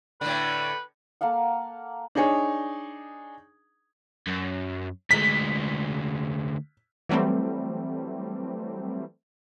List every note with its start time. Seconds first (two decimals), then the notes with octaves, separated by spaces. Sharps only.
0.21 A2 D3 B4
1.21 A#3 A4 F5 F#5
2.15 D4 D#4 G#4 C#5
4.27 F#2
5.11 D2 G#3 B6
7.09 E3 F#3 G3 A3 C4